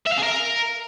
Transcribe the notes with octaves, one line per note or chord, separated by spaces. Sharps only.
E5
F5
G#4
A#4